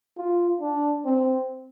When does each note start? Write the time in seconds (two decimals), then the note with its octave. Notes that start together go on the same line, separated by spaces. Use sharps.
0.17 F4
0.61 D4
1.05 C4